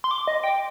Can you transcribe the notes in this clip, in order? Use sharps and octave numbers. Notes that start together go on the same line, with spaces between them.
C6
D6
D#5
G5